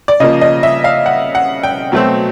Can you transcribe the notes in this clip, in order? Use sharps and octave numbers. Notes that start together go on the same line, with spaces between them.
D5
C#3 F3 A#3 D#5
D#5
E5
F5
F#5
F#5
G5
B2 F#3 A3 C4